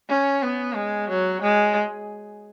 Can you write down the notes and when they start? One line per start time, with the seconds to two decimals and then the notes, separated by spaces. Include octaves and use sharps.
0.08 C#4
0.42 B3
0.75 G#3
1.09 F#3
1.42 G#3